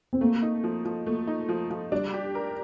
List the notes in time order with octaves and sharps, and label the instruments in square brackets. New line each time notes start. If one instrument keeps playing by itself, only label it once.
[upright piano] C4
[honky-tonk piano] A3 [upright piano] A#3
[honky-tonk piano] D#4
F3
F3
[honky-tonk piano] A3 [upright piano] A#3
[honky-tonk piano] D#4
F3
F3
[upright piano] G3 [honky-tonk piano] D4
[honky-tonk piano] G4
A#4